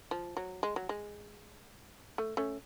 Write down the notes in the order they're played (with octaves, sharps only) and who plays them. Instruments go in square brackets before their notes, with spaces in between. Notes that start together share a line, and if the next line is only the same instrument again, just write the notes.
[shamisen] F3
F#3
G#3
F#3
G#3
A3
A3 C#4